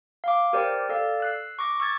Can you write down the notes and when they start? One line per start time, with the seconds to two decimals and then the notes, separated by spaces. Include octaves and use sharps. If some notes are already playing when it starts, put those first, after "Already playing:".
0.24 F5 D6
0.53 G4 A#4 C5 D5 G5
0.89 A4 D5 F5
1.20 E6 F#6 C7
1.59 C#6 D6 A#6
1.80 C#6 E6 G#6 A6